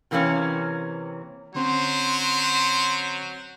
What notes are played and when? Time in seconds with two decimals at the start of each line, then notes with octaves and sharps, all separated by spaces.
0.11 C3 E3 A#3 C4 C#4
1.55 D3 F#3 C4 C#4 C5 C6